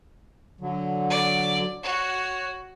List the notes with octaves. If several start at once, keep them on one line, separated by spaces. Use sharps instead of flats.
D3 F#3
D5
F#4 C#5